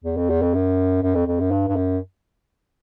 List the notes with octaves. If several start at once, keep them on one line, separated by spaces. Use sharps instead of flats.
E2
F2
E2
F2
F#2
F#2
F2
F2
F#2
G2
G2
F#2